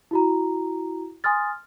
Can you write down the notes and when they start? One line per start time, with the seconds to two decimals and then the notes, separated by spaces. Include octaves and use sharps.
0.11 E4 F#4 A#5
1.24 G#5 C6 D#6 F6 A6